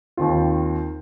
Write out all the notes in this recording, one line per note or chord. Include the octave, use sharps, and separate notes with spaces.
D#2 D#3 C4 F4